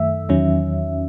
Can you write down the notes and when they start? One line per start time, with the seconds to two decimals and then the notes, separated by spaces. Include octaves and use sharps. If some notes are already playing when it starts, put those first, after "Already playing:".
Already playing: F#2 D#3 A3 E5
0.29 E2 D#3 F#3 C#4